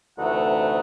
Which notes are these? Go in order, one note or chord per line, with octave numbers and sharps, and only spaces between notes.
D2 C3 E3 A3 D#4 F#5